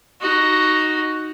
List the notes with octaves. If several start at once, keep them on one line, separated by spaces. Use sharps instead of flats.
D#4 F#4